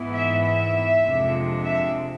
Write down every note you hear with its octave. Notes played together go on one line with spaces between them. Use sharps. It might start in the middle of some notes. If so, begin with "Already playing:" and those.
Already playing: G#2 E3 B3 E4
E5
E5
F2 C3 G#3 D4
E5